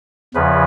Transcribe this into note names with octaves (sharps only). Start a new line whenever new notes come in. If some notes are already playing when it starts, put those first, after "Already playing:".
E2 C#3 F3 B4